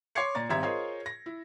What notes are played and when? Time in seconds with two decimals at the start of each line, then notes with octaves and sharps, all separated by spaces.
0.15 C#5 C6 D6 G#6 C7 C#7
0.35 A#2 D5 A#5 A6
0.49 G#1 G3 C4 E5 A#5 G#6
0.63 F4 G#4 A#4 C5 C#5 D#5
1.06 A#6
1.26 E4